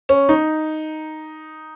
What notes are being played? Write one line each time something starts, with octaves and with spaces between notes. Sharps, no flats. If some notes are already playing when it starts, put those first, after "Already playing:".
C#4
D#4